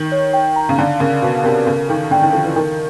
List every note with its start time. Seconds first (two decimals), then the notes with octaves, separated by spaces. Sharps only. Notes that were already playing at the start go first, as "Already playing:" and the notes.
Already playing: D#3
0.12 C#5
0.33 G5
0.56 A#5
0.69 C#3
0.78 D3 F5
1.00 C#3 A#4
1.22 B2 F5
1.44 C3 A#4
1.67 C#3 A4
1.89 D#3 A4
2.11 D3 G5
2.22 D#3
2.33 F3 A4
2.45 E3
2.55 D#3 A#4